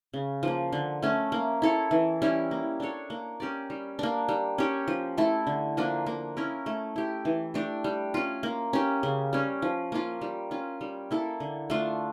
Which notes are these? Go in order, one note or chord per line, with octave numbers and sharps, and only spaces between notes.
C#3
F3 A#3
D3
A3 C#4
A#3
E4 A4 C#5
E3
G3 C#4 E4
A#3
D4 A4 C#5
A#3
C#4 G4 D5
G3
A#3 D4
G3
C#4 G4 C#5
F3
A3 E4 A4
D3
F3 A#3 D4
A#3
C#4 E4 A#4
A3
E4 G4
E3
A3 D4 G4
G3
C#4 F4
A#3
C#4 G4
C#3
G3 C#4
F3
A#3 C#4 F4
G3
C#4 F4
G3
A#3 E4 A4
D3
A3 D4 F4